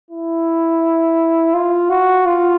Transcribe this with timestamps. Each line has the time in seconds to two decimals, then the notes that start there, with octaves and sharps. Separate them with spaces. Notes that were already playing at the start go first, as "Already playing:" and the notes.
0.11 E4
1.54 F4
1.90 F#4
2.26 F4